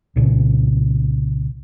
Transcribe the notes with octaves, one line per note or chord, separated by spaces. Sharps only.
C2 A#2 C#3